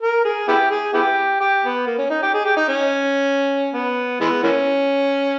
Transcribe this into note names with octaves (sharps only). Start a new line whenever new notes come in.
A#4
G#4
B3 E4 G4
G#4
B3 E4 G4
G4
B3
A#3
C#4
D#4
G4
G#4
G4
D#4
C#4
B3
E3 G#3 B3
E3 A#3 C#4